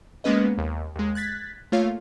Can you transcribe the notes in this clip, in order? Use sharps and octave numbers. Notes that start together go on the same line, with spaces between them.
G#3 A#3 B3 C#4 B4 D#5
D#2
D#2 G#3
F#6 G#6 A6 B6
A3 A#3 F4 C#5 F5